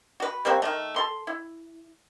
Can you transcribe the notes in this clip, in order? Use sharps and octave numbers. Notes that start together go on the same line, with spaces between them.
F#4 B4
G3 A#3 C4 F#4
D#3 A3
A4 C6
E4